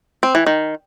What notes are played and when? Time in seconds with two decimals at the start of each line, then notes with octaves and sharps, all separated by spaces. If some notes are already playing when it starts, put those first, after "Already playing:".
0.23 C4
0.35 E3
0.47 D#3